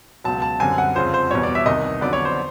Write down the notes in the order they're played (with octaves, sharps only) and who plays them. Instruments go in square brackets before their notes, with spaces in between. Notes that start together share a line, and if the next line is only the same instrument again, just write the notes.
[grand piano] C#2 B2 F#3 A5
A5
F#2 D3 G3 C4 G#5
F#5
F2 C#3 F3 C5
C5
E2 B2 G3 C#5
D5
E5
C2 C3 D#3 D#5
F2 D3 F#3 B3 D4 D5
C#5
C5